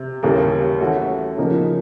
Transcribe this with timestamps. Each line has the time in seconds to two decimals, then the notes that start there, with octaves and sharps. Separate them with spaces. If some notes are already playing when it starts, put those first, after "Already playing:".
Already playing: C3
0.23 D#2 C#3 E3 G3 A#3
0.80 E3 A3 C#4 F#4
1.37 C#3 F3 A#3 D#4